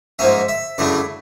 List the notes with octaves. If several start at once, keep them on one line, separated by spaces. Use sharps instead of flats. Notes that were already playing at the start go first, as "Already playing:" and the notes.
G#2 F3 A#3 C#4 E5
E5
F#2 C#3 E3 A3 D4 D5